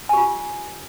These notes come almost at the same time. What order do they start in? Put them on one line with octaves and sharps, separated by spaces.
G#5 G4 F4